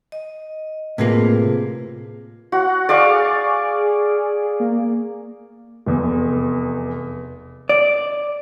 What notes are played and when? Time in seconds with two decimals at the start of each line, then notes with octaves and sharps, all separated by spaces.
0.12 D#5
0.98 A2 C3 A#3 F4 G#4 B4
2.52 F#4 F#5
2.89 G#4 D5 F5 C#6
4.60 A#3
5.86 F1 E2
7.69 D5